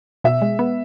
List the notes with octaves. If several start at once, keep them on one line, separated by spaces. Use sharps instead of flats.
B2 E5
G#3
B3